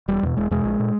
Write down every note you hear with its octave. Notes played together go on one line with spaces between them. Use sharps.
E1 G3
E2 B2
E1 G#3
E2 B2 G#3
A#1
A#2